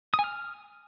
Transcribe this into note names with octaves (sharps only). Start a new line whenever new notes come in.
D#6
G#5
F6